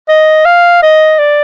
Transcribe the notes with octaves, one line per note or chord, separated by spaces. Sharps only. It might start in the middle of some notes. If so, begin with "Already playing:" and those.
D#5
F5
D#5
D5